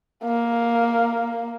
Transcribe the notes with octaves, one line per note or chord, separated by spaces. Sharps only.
A#3